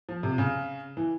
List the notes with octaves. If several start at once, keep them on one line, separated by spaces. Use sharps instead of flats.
F3
C3
C#3
E3